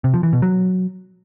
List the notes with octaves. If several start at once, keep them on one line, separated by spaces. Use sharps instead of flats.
C3
F3
E3
B2
F#3